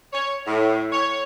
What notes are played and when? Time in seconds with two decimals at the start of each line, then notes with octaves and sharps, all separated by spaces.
0.13 C#5
0.47 A2
0.92 C#5